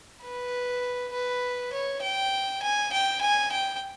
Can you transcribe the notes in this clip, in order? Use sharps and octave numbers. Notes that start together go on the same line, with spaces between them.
B4
B4
C#5
G5
G#5
G5
G#5
G5